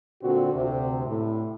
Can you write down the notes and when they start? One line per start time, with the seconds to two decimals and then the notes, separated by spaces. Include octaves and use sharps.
0.23 A#2 D3 C4 F#4
0.53 D2 C3
1.06 A2